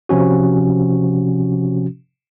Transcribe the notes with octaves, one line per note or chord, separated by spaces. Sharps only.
C3 F3 C#4 F#4